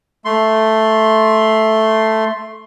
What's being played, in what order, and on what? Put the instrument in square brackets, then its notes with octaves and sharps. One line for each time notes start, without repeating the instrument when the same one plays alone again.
[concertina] A3 C6